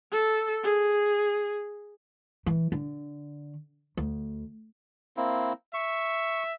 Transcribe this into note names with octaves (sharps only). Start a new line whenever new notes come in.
A4
G#4
E3
D3
D2
A#3 C4 E4
E5 C#6